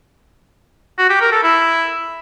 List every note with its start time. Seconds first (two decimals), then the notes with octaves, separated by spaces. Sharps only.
0.98 F#4
1.10 G4
1.21 A#4
1.32 A4
1.43 E4